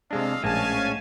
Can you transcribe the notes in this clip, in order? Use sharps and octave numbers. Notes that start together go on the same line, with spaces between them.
C3 G#3 D4 A4 D#5 F5
A#1 A2 G#3 C#4 F5 G#5 A5